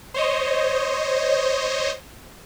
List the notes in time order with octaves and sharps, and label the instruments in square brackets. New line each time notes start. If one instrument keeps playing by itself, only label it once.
[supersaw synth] C5 C#5 D#5